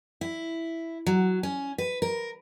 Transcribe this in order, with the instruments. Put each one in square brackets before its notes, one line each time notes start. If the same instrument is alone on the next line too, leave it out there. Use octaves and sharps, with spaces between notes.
[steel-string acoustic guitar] E4
F#3
C#4
B4
A#4